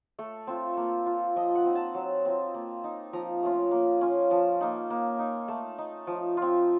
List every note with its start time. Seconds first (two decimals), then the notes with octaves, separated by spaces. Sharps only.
0.19 A3 A4
0.47 C4 F4
0.77 A#3
1.06 F4
1.36 F3 D#5
1.55 F#5
1.65 C4 D#4
1.75 A5
1.95 F#3
2.25 C4 F4
2.55 A#3
2.84 D#4
3.13 F3 A#5
3.43 A3 C#4 F4
3.71 A#3
4.01 C#4 F4
4.30 F3 A5
4.61 A#3 D#4
4.90 A#3
5.19 D#4
5.48 A3 A5
5.78 D#4
6.07 F3
6.37 C4 F4